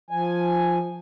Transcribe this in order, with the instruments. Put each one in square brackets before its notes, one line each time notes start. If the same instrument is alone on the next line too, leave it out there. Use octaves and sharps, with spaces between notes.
[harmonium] F3 G#5